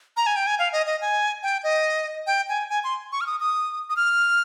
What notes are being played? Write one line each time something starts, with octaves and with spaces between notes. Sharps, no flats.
A#5
G#5
G5
G#5
F5
D#5
D#5
G#5
G5
D#5
G5
G#5
G#5
C6
C#6
F6
D#6
D#6
D#6
F6